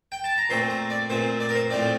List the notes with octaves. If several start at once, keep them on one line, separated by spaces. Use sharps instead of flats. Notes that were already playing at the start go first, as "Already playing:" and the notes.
G5
A5
A#5
A#2 A3 C4 C6
A#5
D5
A#2 A3 C4 C5
D5
A#4
C5
A2 F3 A3 C4 D5